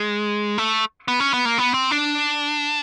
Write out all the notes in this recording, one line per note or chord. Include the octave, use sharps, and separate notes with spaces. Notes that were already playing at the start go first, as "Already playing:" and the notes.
Already playing: G#3
A3
B3
C#4
B3
A#3
B3
C4
D4